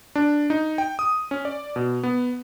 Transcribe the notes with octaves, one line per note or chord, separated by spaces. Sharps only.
D4
D#4
G5
D#6
C#4
D5
B2
B3